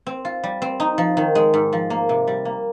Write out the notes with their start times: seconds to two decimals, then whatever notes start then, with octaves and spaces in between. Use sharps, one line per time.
0.07 C4
0.25 F4
0.44 G3
0.62 C4
0.80 D#4
0.98 F3
1.17 D#3
1.35 G#3
1.54 G#2
1.73 F3
1.90 A#3
2.09 C3
2.27 G3
2.45 A#3